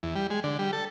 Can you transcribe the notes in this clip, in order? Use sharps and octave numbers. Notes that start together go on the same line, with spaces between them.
E2
G3
G#3
D3
G3
A4